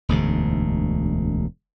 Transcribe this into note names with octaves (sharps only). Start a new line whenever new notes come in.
E1 D2 G#2